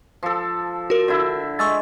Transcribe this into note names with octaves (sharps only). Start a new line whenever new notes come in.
F3 A4
F#4 A#4
D3 E4
G#3 C#6 E6 A6